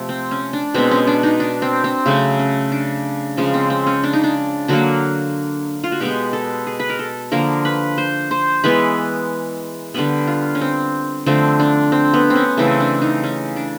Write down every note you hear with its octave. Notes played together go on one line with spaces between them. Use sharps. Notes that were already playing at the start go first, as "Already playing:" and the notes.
Already playing: C3 F3 A3
C4
C#4
D4
B2 G#3 B3 C4
C#4
D4
D#4
D4
C4
C4
C#3 F#3 A3 C#4
C#4
D4
C#3 F3 G#3 C#4
C4
C4
C#4
D4
D#4
D4
D3 F#3 A#3 F#4
F4
F#4
B2 G#3 B3 G4
A4
G#4
B4
A#4
A4
D3 F3 A#3 A#4
B4
C5
C5
E3 G#3 B3 B4
D3 G3 B3 B4
F4
C#4
C4
D3 F3 A3 C4
D4
C4
B3
C4
C#4
C#3 E3 A3 C4
D4
D#4
C#4
D4